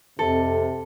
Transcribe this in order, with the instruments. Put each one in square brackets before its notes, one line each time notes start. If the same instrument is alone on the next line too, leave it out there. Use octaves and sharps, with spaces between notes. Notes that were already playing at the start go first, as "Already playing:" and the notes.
[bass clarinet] F2 [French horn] C3 [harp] A4